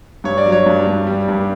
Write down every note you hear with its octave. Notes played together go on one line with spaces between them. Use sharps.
G2 C#5
D5
F#3
C#5
G2
G2
G3
G2